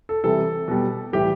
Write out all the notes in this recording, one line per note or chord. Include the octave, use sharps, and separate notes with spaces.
A4
C3 E3 G3 A4
B2 G3
A2 E3 G3 G4